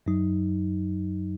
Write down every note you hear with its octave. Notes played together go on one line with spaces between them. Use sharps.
F#2 F#3 D#4